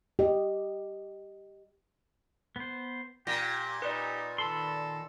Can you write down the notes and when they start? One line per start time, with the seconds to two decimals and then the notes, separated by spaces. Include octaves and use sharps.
0.19 G4 D#5
2.56 B3 C5
3.27 A#2 G4 G5 A#6
3.82 D#4 G4 B4 D5
4.38 D#3 A4 B5 C6